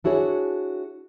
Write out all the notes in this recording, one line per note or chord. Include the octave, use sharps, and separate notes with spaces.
D4 E4 F#4 G#4 C#5